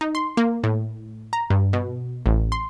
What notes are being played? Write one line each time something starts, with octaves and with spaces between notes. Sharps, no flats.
D#4
C6
A#3
A2
A#5
G2
B2
A1
C6